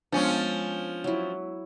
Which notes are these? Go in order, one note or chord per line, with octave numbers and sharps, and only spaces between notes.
F3 G#3 B3 C#4 D4 G5
A4 G#5
F#3 E4